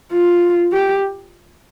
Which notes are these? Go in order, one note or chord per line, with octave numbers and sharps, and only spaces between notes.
F4
G4